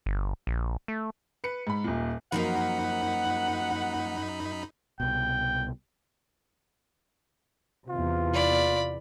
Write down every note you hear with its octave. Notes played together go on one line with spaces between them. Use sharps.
G1
A#1
A3
B4 C#7
G#2 B5
D#1 A#2
F#2 F3 F#3 A#3 D#4 F#5 B5
C2 B2 G5
E2 C3 F4
D5 B5